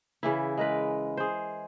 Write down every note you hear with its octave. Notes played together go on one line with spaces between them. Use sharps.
C#3 E3 E4
G#3 A#4 B4
G#4 C5